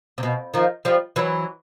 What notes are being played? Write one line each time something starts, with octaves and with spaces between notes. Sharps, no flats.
C3
B2
D#3 F3
F3 G3
E3 F#3